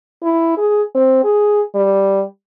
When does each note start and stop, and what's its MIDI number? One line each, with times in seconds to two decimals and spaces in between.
0.23 0.56 64
0.58 0.82 68
0.95 1.20 60
1.24 1.62 68
1.75 2.24 55